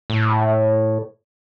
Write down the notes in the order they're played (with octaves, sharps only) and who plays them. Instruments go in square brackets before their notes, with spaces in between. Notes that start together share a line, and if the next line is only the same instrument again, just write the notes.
[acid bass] A2